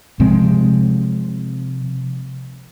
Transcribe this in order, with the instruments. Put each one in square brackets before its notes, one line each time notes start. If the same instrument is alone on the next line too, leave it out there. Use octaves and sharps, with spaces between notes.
[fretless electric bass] C3 F3 G#3 C4